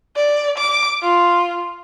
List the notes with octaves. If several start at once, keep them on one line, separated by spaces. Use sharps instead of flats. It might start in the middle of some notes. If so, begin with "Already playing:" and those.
D5
D6
F4